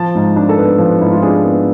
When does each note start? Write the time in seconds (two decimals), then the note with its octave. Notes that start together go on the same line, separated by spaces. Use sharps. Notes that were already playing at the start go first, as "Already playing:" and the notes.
Already playing: F3 A5
0.15 G#2
0.36 D4
0.49 A4
0.58 B3 B4
0.79 F3
1.01 G#2 E4
1.11 F4
1.22 D4 G#4
1.44 B3